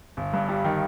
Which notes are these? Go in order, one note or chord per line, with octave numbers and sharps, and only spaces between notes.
G1
G2
G3
D#3